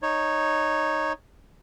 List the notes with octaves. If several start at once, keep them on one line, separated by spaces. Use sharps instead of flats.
D#4 C#5